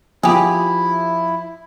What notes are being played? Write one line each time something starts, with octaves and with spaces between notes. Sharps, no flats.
F3 E4 G4 G#4